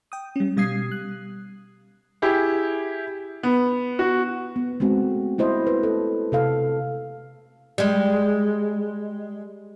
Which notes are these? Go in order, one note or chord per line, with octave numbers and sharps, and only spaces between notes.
G5 D#6
G3 C#4
B2 G3 F5 D#6 G#6 C7
F#6
E4 G4 G#4
B3
F#4
B3
G#3 A3 C4 F#4
A3 E4 C5 D#5
B4
A4
C3 A4 F5
G3 G#3